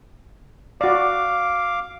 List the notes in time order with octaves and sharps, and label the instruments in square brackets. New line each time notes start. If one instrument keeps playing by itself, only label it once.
[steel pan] F#4 D5 [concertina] F5 D6